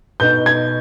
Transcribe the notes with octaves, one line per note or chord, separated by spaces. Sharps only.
B2 B3 D#4 G6
G#6